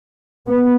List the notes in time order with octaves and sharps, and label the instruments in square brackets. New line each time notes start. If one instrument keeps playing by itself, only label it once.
[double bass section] B3